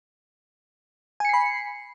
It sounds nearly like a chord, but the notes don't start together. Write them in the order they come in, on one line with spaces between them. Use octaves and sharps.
G#5 C#7 C7 B5